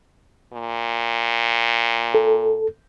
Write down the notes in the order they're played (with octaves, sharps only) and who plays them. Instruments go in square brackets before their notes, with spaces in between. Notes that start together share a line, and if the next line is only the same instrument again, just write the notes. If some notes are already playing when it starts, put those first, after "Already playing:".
[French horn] A#2
[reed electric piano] A4